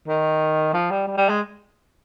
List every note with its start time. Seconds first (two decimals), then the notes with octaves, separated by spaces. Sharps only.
0.08 D#3
0.73 F3
0.91 G3
1.07 G3
1.18 G3
1.29 G#3